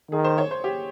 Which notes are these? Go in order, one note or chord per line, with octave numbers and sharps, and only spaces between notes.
D#3 G#4
C5
C#5
C5
G4